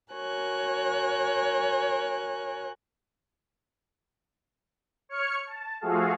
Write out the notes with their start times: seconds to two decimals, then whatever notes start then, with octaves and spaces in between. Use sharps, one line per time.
0.11 F#4 A#4 C#5 G#5 F#6
5.09 C#5 C#6 F6 C#7
5.47 A5
5.81 F3 A3 F#4 G#4 A4 F5